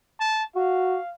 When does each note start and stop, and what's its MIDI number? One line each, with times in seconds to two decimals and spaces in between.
0.20 0.44 81
0.56 0.97 66
0.56 1.14 77